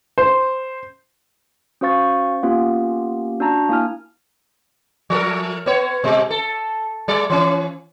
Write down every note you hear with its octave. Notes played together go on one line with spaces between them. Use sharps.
C5
C#4 F#4 C5 F5 C#6 A6
A#3 B3 C#4 F4 G4
D4 F#4 A5 A#5
A#3 E4 G#5 F6
F3 A4 A#4
B3 C#5
B2 G#3
A4
G3 D5
E3 C#4